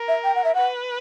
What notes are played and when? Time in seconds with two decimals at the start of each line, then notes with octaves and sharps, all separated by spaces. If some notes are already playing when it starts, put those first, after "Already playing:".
Already playing: A#4
0.08 E5
0.24 G5
0.35 F#5
0.44 E5
0.55 B4 F#5